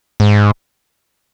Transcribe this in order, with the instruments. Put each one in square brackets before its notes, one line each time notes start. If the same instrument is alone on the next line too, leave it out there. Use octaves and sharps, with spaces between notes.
[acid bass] G#2